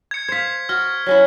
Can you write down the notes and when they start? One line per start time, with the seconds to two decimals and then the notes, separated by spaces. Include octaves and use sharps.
0.11 G#6 C#7
0.29 C5 F5 G#6 B6
0.69 F#4 F6
1.06 F#3 C#4 E4